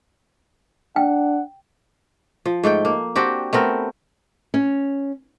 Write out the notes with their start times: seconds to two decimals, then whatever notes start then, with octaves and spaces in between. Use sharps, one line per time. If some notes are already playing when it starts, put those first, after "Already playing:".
0.96 D4 F#5 G5
2.46 F3
2.64 G#2 A3 A4 G5
2.85 A#3
3.16 C4 D4 F#4 G4
3.53 A3 B3 C4 A#4
4.54 C#4